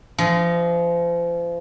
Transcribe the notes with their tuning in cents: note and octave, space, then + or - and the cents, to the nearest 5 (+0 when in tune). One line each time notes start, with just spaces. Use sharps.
F3 -35 D#5 +0